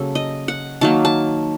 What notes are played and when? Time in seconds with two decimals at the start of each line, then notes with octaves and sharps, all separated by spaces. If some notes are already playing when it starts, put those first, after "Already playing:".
Already playing: C#3 F#3 A#3 A4
0.15 D#5
0.48 F#5
0.81 D#3 F#3 A#3 A5
1.05 A5